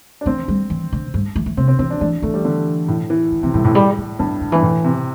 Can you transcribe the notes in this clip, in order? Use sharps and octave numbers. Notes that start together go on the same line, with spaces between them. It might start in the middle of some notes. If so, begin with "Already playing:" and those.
D4
E3 C4
G3
E3
D3
G2
E3
E3
C3 C4
C4
E3 C4
D4
E3 D4
E3 A3
G3
D3
A2
E3
D3
C3 E3
A2 G3
A2 E3
G3
E3
G2 D3
D3
G2 E3
A2
C3